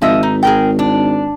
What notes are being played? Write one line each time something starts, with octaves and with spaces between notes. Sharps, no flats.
G#1 F3 D#5 E5
D#4
G#4 A#4 G5
D4